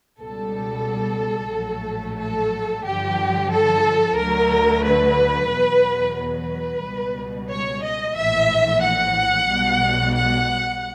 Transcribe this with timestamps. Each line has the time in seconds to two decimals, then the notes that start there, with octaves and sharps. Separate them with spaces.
0.20 C#2 B2 G3 A4
1.53 A#1 A2 F#3 A3
2.19 A4
2.85 G2 D3 F3 G4
3.51 A4
4.18 D2 D3 F#3 A3 A#4
4.84 B4
5.50 E2 B2 F#3
6.16 B4
6.83 C#2 B2 G3
7.49 C#5
7.82 D#5
8.15 A#1 A2 E3 E5
8.82 F#5
9.48 B1 B2 G3
10.15 F#5